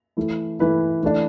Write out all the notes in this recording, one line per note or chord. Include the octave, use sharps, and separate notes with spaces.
E3 A3 E4
E3 A3 E4 B4
E3 A3 D4